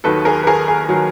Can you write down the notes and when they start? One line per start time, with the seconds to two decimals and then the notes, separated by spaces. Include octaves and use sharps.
0.04 D#2 D#3 F#3 A4 B4
0.25 G#4 A#4
0.43 B4
0.47 G#4 A#4
0.68 G#4
0.89 D#3 F#3